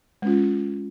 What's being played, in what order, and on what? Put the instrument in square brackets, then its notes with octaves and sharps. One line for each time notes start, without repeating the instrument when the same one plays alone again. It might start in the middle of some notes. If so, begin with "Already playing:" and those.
[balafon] G#3 C#4 F4